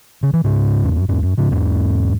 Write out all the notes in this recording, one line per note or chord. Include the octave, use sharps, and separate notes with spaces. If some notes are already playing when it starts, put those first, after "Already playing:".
C#3
E3
G#2 C#3
E2
F#2
E2 G#2
F#2
G#2 C#3
E2 G#2